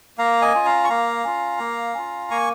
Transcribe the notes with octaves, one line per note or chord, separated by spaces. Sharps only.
A#3 F5 A#5
D#5 G#5
C#4 F4
F5 A#5
C#6
A#3 F5 A#5
C#4 F4
A#3
C#4 F4
A#3 G#5 C#6